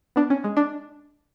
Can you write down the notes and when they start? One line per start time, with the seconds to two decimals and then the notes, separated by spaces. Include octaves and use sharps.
0.16 B3 D4
0.30 C#4
0.44 G#3
0.57 D4